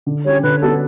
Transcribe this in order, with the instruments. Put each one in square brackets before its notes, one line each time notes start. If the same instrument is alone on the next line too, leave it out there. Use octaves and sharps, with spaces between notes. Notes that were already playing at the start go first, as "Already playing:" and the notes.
[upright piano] D3
[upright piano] G3 C#4 G4 [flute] C#5
[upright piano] D3 [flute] B4
[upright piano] G3 B3 D4 F#4 [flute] A4